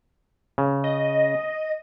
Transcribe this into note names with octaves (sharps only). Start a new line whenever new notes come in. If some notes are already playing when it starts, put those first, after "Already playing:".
C#3
D#5